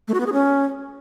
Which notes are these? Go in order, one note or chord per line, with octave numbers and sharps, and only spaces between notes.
A3
F#4
B3
G#4
C#4